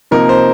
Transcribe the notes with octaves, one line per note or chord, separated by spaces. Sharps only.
C3 F3 A#3 D#4 A#4
C5